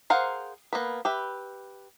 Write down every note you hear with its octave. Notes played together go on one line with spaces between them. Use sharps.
G#4 A#4 C5 F5 F#5
A#3 B3 B4
G4 B4 E5